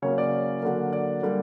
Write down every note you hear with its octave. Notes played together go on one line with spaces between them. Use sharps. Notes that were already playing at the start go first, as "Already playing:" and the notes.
C#3 F#3 A#3 C#5
D5
D3 F#3 A#3
D5
D3 G3 A#3